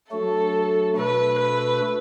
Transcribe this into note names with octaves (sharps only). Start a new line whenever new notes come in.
F#3 A3 D4 F#4 A4
B2 A3 D4 F#4 A4 B4
B4